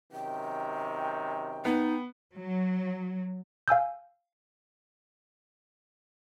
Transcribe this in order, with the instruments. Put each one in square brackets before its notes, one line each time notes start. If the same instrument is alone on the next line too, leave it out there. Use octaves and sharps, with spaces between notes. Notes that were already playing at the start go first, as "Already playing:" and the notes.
[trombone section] F#2 C3 D#3 [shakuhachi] G5
[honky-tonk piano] B3 [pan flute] D#4
[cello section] F#3
[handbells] F5 G#5 E6 G6